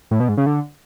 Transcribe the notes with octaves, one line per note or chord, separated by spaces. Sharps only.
A2
B2
G#2
C#3
D3